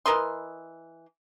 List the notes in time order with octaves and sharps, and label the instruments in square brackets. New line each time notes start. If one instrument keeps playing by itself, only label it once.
[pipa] E3 A#4 D#5 C6